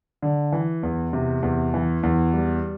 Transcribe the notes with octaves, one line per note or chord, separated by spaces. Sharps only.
D3
E3
E2
C3
E2
E3
E2
G3